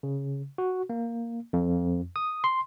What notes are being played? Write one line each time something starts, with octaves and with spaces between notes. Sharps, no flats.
C#3
F#4
A#3
F2
D#6
C6